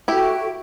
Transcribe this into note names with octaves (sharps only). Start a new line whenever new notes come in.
E4 F#4 G4 A4 E5 G5